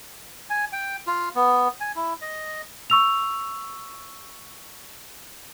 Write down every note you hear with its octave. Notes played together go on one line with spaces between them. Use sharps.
G#5
G5
F4
B3
G#5
E4
D#5
C#6 E6 F7